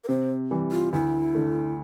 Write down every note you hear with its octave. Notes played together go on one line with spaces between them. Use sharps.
A#4
C3 C5
E3 G3
F4
D2 E4
D3 A3